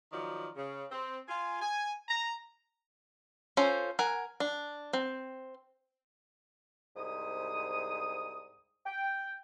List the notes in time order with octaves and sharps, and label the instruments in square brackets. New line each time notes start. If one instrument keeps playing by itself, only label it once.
[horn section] D#3 F3 F#3 D5
C#3
C4
F4 G#5
G#5
A#5
[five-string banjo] C#4 F4 A4 C5
A#4 F#5 G#5
D4
C4
[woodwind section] C2 G#2 D#6
G5